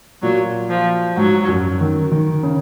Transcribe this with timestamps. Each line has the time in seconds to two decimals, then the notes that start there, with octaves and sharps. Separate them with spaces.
0.22 A#2 F#3
0.70 F3
1.17 G#2 F#3
1.48 F#2
1.81 D#3
2.12 D#3
2.43 C#3